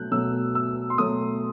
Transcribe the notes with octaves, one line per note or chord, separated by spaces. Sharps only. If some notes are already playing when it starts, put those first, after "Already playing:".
Already playing: B2 F#3 A3 F#6 G6
B2 F#3 A3 E6
E6
C6
B2 F#3 A3 D#6